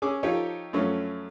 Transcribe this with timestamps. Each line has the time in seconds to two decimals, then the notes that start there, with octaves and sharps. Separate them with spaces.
0.02 C#4 G#4 D6 E6
0.23 F3 D#4 F4 G4 A4 C#5
0.73 F#2 F3 A3 C#4